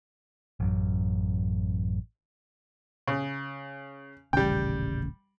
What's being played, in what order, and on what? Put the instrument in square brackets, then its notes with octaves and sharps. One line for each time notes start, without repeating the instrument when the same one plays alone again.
[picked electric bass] A1 F#2
[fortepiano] C#3
[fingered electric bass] D#1 A1 C#3 [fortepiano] G3 G5